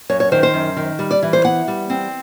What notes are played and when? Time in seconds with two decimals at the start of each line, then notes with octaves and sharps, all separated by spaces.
0.09 F#2 C#5
0.20 C#5
0.32 D#3 C5
0.43 C5
0.54 F#2
0.77 D#3
0.99 G3
1.11 D5
1.23 E3
1.33 C5
1.45 B3 F#5
1.68 G3
1.90 C4